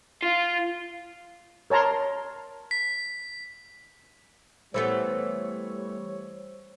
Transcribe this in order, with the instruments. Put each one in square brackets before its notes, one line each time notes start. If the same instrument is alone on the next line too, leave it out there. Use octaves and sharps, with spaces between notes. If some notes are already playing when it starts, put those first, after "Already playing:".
[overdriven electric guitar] F4
[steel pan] A#4 C#5 A5 A#5 C6
[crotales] B6
[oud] E3 A3 B3 [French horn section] G3 C#5 [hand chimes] C5 E6